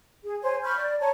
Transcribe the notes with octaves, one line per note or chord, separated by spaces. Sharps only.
G#4
C5 C#5 G#5
B5 C#6 F6 G6
D5
C#5 A5 A#5